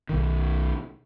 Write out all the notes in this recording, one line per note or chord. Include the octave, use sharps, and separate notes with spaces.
B1 D#3